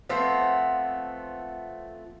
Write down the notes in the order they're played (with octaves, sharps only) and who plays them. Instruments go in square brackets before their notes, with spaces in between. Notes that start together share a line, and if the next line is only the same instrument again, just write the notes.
[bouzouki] F3 A3 B3 C4